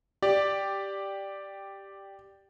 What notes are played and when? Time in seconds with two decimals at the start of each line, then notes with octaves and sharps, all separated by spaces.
0.22 G4 D5